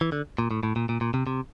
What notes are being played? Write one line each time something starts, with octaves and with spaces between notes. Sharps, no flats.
E3
D3
A#2
A2
A2
A#2
A#2
A#2
C3
C3